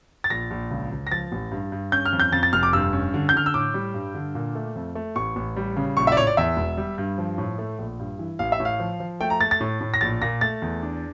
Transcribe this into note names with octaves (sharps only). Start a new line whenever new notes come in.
A6
A#1 A#6
A#1
C#2
C#2
A#6
F3 A6
A1
G2
G2
C#4 G6
F6
F2
G6
F2 A6
A6
F1 F6
D6
G2 E6
C#4
D3
G6
D3 F6
E6
A2 D6
G3
G2
D3
A#2
A3
F2
A3
A1 C#6
A1
G3
C#3
A#1 C#6
E5
D5
A2 C#5
D5
E2 E5
E1
G3
G2
F3
A2
A3
A#1
G2
E3
A1 F5
E5
A2
F5
F3
F3
A3 G5
A#5
A3 A6
A6
A2
A2
A#6
A#1 A6
A#2 A#6
A3 A6
E2
D4